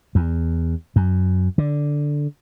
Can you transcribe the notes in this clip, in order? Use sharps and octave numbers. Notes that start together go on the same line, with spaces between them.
E2
F#2
D3